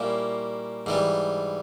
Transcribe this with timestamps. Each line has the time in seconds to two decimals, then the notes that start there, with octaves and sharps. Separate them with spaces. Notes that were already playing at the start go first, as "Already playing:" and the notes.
Already playing: A#2 G3 A#3 C#4 E4
0.86 G#2 E3 G3